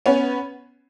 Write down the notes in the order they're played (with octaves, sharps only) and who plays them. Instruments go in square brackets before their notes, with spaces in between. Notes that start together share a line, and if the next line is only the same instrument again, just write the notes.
[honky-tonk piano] B3 C#4